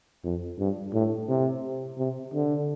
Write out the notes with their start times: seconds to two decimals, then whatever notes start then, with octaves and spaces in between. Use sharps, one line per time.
0.24 F2
0.59 G2
0.94 A2
1.29 C3
1.98 C3
2.34 D3